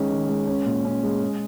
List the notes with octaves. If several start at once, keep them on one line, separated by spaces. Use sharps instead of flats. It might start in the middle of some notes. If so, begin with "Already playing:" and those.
Already playing: D#3 G#3 C#4
D#3
G#3
C#4
A#2
C#4
G#3
G#4